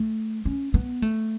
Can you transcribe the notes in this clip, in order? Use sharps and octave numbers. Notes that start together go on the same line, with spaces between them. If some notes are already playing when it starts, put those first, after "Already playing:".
Already playing: A3
C#4
B3
A3